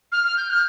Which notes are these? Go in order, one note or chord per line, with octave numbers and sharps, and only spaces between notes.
F6
F6
G6
F6